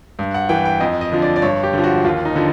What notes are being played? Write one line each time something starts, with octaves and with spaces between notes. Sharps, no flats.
G2
F#5
E3 G5
G5
F2 D#5
D#5
D3 F3
D5
D5
G2 C#5
G4
D3 F3
F#4
D#2 F4
D#4
D3 F3